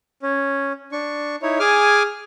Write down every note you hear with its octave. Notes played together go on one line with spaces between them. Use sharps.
C#4
D4 C#6
D#4 E4 C#5
G#4 G#5 D6 F6